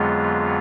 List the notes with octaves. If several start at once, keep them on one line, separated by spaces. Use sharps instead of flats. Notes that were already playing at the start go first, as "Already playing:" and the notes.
Already playing: F2 D3 F#3 G#3 B3 F4